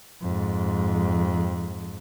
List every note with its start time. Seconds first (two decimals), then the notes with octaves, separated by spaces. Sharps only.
0.22 F2 G#2